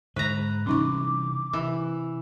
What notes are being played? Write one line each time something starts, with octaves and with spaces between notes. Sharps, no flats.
G#2 D3 G#3 B4 A#5
C3 E3 G3 C#4 D#4 C#6 D6
C3 E3